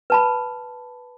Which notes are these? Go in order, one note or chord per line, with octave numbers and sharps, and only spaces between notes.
B4 A5 B5